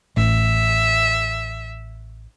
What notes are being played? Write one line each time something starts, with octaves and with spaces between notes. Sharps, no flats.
A1 E5